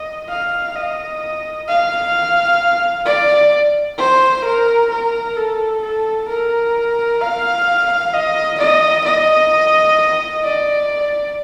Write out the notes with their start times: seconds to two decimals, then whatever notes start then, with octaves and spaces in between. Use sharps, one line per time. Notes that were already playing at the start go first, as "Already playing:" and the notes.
Already playing: D#5
0.29 F5
0.76 D#5
1.68 F5
3.06 D5
3.98 C5
4.45 A#4
4.91 A#4
5.36 A4
5.83 A4
6.29 A#4
7.21 F5
8.14 D#5
8.59 D#5
9.05 D#5
10.44 D5